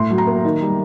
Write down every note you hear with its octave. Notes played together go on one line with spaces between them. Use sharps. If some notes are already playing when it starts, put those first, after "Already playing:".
Already playing: A2 C6
F#3
A#5
A#3
D#3
G3